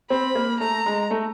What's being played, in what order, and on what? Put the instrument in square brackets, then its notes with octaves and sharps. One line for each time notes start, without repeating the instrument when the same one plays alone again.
[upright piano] C4 [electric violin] B5
[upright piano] A#3
[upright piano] A3 [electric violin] A#5
[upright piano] G#3
A3